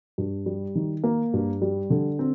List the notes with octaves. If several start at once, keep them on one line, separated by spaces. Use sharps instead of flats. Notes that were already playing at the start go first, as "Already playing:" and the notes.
G2
G3
D#3
A#3
G2
G3
D3
C4